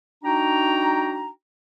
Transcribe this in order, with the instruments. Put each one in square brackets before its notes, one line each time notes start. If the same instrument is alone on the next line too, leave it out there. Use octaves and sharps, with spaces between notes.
[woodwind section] D4 D#4 F#4 G5 A#5